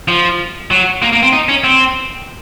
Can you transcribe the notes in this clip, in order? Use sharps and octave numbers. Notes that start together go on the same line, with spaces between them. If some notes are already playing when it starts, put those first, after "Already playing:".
F3
F#3
A#3
A#3
C4
D#4
C#4
C4